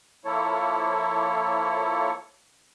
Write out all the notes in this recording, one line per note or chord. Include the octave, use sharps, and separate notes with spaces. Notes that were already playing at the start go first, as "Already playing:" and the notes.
F3 A#3 E4 A4 C#5